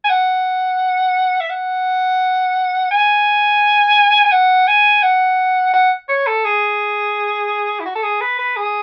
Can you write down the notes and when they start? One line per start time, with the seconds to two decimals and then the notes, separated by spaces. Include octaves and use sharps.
0.04 G#5
0.09 F#5
1.40 E5
1.50 F#5
2.91 G#5
4.25 G#5
4.32 F#5
4.68 G#5
5.03 F#5
5.74 F#5
6.09 C#5
6.27 A4
6.45 G#4
7.80 E4
7.86 F#4
7.95 A4
8.03 G#4
8.21 B4
8.39 B4
8.56 G#4